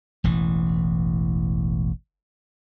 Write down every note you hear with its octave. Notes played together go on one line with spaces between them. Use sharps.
E1 A1 E3